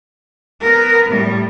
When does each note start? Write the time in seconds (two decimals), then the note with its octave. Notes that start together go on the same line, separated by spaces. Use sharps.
0.61 B3 A#4
1.09 A2 G3